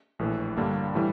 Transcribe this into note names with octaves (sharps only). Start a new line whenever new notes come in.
A#1 A2 E3
G2 D3 G3 A#3 D4
A2 E3 G3